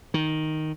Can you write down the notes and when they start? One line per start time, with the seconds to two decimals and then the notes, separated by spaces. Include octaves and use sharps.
0.14 D#3